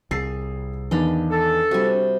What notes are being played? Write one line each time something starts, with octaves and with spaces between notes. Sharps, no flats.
C2 G#4 E6 A6 C7
E2 D#3 D4 D#5 F5 B5 A6
A4
C3 G3 F4 F#4 G#5